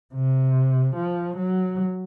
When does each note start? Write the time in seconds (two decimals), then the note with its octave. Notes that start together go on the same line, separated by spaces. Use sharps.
0.14 C3
0.96 F3
1.37 F#3